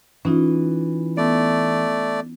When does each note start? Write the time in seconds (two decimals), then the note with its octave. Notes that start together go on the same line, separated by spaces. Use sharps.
0.25 E3 C#4 D#4 F4
1.17 A3 B3 D5